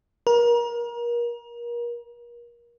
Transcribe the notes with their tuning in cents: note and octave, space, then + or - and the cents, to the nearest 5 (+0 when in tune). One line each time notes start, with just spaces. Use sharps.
A#4 +30